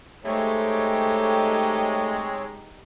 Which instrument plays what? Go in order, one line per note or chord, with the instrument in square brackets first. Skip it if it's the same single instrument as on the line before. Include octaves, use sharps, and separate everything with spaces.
[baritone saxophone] G#3 [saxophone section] A3 [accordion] C4 C#5 [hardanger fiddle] D#4 G4